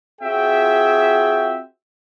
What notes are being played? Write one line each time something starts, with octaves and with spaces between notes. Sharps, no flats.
C4 F4 F#4 G#4 E5 G5